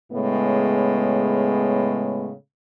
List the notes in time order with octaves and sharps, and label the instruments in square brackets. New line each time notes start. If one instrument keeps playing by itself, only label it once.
[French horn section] A2 C#3 G#3 B3